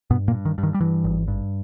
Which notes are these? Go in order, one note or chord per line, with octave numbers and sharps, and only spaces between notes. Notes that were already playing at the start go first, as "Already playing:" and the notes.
G2 B2 B3
A#2 A#3
G2
D#3
G2
D#3
G3
G2 E3
G#1
G2